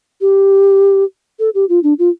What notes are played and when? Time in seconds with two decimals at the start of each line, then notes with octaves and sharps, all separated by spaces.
0.21 G4
1.39 A4
1.55 G4
1.69 F4
1.83 D4
1.99 F4